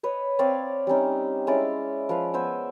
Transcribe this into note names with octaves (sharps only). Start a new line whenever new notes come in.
B4 C#5 D#5
C4 C#5 D5 F5
G3 C4 C#4 D#4
G#3 C#4 E4 D5
F3 B4 F5
B3 C5 G#5 E6